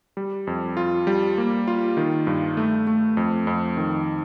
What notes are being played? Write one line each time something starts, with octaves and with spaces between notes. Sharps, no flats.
G3
F2
F4
G3
A#3
F4
D#3
G2
A3
A3
F2
F2
D#3